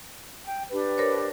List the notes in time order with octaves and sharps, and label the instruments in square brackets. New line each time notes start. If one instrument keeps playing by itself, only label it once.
[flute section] G5
D4 G4 B4
[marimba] A#4 C5 C#5